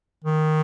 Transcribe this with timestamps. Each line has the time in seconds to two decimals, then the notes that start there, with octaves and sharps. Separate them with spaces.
0.24 D#3